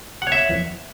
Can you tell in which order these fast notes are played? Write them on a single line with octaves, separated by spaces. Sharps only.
F#5 C#5 E5